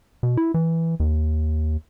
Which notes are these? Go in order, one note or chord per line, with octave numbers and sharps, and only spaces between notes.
B2
E4
E3
D#2